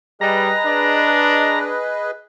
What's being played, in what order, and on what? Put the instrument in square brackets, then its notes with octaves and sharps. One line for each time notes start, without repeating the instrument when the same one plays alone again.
[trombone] G3 [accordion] G#4 B4 D#5 [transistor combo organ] A#5
[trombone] D4